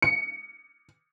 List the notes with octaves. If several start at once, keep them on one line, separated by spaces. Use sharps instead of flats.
C#7